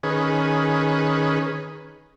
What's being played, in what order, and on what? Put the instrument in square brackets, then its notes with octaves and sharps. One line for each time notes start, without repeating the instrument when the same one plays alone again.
[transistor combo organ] D#3 C#4 G#4 B4